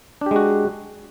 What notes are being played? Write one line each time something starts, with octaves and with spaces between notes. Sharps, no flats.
G#3 D4 F#4 G4